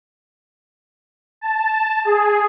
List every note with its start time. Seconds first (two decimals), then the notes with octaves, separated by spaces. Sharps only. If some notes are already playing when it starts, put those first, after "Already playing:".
1.41 A5
2.05 G#4